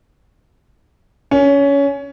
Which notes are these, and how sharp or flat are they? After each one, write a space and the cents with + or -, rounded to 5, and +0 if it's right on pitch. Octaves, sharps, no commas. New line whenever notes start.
C#4 +20